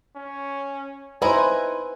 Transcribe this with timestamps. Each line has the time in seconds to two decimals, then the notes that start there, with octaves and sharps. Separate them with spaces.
0.16 C#4
1.22 D#4 E4 B4 C5 G#5 A#5